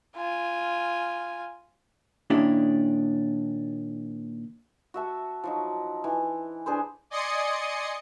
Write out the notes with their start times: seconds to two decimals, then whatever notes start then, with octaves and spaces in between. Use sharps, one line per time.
0.16 F4 G#5
2.30 A#2 D#3 C#4 D4 E4 G4
4.94 F#4 E5 A5
5.44 F3 F#3 D#4
6.04 E3
6.66 D4 G#4 B4 C5
7.10 D5 D#5 G#5 C6 D#6 C#7